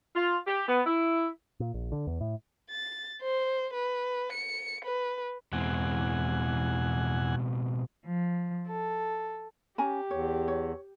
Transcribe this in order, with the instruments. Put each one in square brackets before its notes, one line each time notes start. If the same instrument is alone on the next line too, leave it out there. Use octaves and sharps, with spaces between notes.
[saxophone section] F4
G4
B3
E4
[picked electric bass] A#2
A#1
D3
E2
A2
[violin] A6
C5
B4
C#7
B4
[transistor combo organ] E2 F#5 G#5 [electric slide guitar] B2 G#3 C4
[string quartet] F3
A4
[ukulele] C#4 G#5 A#5 [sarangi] G4
[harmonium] E2 [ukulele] C#5
[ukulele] C#5